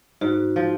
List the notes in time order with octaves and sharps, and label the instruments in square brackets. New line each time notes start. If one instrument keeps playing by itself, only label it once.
[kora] G#2 [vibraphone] F#4
[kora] F3